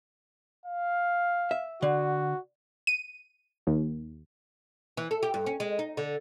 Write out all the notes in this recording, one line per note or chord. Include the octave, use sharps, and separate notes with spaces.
F5
E5
D3 F#4
D#7
D#2
E3
A4
G4
G2
C#4
G#3
D#4
D3